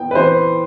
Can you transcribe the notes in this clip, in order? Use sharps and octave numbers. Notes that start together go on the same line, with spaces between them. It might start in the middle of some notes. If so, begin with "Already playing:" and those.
Already playing: E3 B3 G5
B4
E3 C5